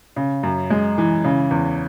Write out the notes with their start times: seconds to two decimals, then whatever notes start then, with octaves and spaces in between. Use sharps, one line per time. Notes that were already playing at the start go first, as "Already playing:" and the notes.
0.16 C#3
0.43 F#2
0.70 G#3
0.98 E3
1.24 C#3
1.51 E2